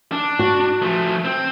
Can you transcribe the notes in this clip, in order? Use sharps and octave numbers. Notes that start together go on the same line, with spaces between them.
D4
F#4
F3 A3
C4